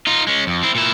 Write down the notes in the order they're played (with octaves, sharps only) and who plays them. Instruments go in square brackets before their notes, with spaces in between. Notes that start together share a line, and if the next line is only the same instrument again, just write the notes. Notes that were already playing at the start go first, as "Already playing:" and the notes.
[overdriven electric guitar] D#4 F4
G#3 C#4
F2
C4 E4
A#2 E4